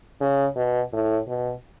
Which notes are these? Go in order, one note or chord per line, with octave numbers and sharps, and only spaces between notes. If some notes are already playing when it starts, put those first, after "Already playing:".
C#3
B2
A2
B2